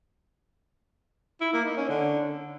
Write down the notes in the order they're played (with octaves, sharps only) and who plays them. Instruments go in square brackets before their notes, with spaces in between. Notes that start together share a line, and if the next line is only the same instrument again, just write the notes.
[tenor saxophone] E4
A#3
D#4
C#4
D3